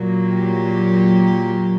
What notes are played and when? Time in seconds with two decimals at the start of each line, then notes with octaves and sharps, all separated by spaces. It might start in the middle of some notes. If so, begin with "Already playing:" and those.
Already playing: A#2 F#3 A#3
0.27 G4